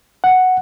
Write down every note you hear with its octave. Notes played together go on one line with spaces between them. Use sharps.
F#5